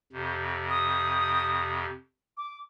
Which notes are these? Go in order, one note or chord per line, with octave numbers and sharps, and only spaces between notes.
F2 C3
D#6
D6